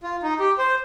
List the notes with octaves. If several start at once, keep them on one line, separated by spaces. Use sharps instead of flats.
F4
D#4
G4
C5